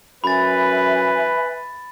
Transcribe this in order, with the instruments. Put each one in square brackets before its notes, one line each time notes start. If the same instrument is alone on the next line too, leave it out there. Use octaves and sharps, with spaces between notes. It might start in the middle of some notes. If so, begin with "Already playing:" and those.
[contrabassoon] F#2 [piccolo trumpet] B4 [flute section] E5 G#5 [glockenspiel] B5 A6